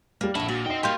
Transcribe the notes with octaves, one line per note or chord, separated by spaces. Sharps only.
G3 A#3 F6
A#1 F2 E4 A4 F#5
A#2 F#4
D#4 C5 D#5 G5
A#3 F#4 G4 F5 G5 C6 G6